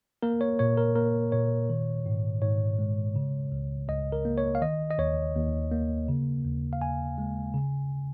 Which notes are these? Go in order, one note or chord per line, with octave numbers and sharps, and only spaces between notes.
A#3 A#4
C#5
A#2 C#5
A#4
A#3 A#4
A#2 C#5
D#3
G#2
G#2 C#5
G#3
C#3
C#2
C#2 D#5
A#4
A#3
C#5
F5
D#3 D#5
D#5
D#2 C#5
D#2
A#3
C#3
D#2
F5
D#2 G#5
G#3
C#3